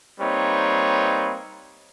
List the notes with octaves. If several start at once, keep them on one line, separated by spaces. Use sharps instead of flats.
G3 A#3 C4 D#4 B4 C#5